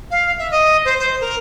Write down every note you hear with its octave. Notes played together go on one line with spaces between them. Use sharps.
F5
E5
D#5
C5
C5
A#4